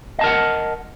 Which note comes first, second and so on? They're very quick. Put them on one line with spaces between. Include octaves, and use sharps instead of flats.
D#5 A5 A#4 F#5